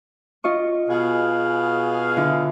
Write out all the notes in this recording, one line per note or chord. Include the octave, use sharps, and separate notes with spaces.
F4 D#5 C#6
B2 G#4 F5
D3 E4 F4